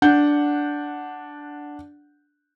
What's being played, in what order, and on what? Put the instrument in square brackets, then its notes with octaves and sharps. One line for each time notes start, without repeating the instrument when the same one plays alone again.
[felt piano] D4 F#5 G6